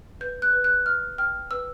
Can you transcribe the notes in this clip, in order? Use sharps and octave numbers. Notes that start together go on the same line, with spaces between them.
B4 G6
F#6
B4
F#6
E5 F6
G5 F6
B4 E6